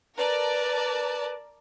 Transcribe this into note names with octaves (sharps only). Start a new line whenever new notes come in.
A#4 B4 D5 A5